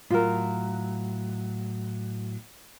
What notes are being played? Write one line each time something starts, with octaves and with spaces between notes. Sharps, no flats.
A2 F#3 F4 A#4